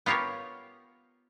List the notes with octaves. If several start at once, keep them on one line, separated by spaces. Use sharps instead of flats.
B3 F4 G4 A#4 C#5